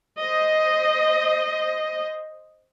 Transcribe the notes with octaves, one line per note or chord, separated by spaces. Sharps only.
C5 D#5